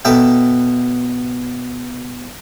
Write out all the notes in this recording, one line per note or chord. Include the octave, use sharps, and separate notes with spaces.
B2 A4 E5 G5